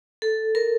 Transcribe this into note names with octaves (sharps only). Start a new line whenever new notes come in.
A4
A#4